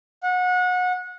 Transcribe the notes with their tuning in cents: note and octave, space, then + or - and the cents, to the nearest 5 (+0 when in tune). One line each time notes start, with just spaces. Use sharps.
F#5 -25